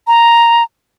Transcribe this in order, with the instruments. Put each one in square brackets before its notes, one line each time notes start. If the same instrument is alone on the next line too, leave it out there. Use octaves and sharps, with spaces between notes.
[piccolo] A#5